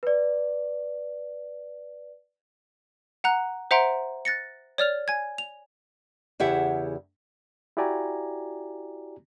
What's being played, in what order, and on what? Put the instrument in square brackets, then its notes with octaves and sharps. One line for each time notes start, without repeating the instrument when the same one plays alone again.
[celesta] B4 D5
[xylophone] F#5 A#5 F#6
C5 E5 F#5 A#5 C6 D7
F#6 A6 A#6 C#7
C#5 D5 F6 F7
G#5 G#6
F7
[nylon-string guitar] E2 C#3 E4 G4 E5 F#5
[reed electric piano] E4 F#4 G4 D5 G#5 A#5